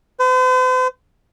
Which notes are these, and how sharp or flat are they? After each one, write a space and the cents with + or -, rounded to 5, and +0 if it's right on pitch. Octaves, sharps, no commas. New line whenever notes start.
C5 -45